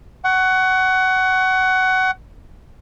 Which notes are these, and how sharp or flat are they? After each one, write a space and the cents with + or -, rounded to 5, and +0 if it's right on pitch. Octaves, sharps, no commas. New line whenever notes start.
F#5 +20 C#6 +0